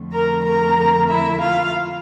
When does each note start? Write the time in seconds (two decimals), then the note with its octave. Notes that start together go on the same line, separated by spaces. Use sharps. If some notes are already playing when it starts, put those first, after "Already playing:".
Already playing: F2 D3 A3
0.13 A#4 A#5
0.45 A#4 A#5
1.09 E4 E5
1.41 F4 F5